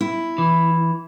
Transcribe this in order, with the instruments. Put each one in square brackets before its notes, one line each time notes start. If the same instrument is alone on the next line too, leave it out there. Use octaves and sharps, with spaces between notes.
[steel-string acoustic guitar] E4
[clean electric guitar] E3